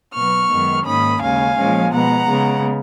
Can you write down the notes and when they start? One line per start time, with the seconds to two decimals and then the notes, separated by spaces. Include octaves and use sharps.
0.14 B2 F#3 B3 C#6 F6
0.50 F#2 D#3 G#3 B3
0.86 G#2 D#3 A#3 C#4 B5 D#6
1.22 D#2 C#3 G#3 C#4 F5 G#5
1.57 A#2 F3 G#3 C#4
1.93 B2 G#3 B3 F#5 A#5
2.29 C#3 G#3 B3